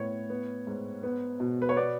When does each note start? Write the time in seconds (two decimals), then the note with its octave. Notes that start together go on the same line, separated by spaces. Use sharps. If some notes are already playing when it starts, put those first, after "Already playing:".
Already playing: A2 B3 C#5
0.30 B3
0.67 G#2
1.03 B3
1.40 B2
1.62 B4
1.69 C#5
1.76 B3 D5